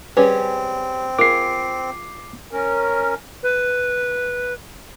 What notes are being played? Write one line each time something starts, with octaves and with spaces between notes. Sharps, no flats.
G3 C4 C#4 G#4 B4
F4 G#4 A#4 D6 C7
C#4 A#4
B4